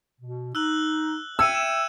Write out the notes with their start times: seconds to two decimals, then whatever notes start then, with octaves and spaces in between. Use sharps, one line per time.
0.20 B2
0.55 D#4 E6 F#6 F#7
1.39 E5 G5 E6 G#6 C#7 D#7
1.55 E7